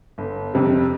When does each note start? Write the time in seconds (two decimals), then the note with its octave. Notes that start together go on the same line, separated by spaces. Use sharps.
0.18 G1
0.54 F2 C3 G3